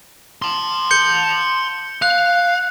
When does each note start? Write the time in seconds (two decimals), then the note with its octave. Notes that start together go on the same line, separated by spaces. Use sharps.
0.42 A5 C6
0.91 G6 C#7 G7
2.02 F5 F#6